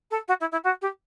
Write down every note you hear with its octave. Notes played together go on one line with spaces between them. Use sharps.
A4
F#4
E4
E4
F#4
G4